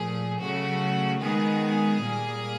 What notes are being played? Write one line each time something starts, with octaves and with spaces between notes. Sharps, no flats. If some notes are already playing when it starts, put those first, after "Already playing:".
Already playing: A#2 F3 A3 G#4
C#3 F#3 A3 F#4
D#3 G#3 B3 G#4
A#2 G3 A#3